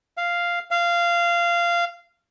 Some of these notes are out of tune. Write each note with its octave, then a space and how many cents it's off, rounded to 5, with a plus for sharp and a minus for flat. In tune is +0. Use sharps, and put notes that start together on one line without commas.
F5 -5
F5 -15